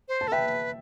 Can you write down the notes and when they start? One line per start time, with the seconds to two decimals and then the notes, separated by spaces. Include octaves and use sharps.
0.08 C5
0.21 A5
0.28 A4
0.32 B4 E5 G5